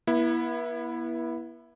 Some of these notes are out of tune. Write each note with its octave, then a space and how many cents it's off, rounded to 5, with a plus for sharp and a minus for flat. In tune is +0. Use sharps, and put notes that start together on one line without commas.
B3 -40 E4 +0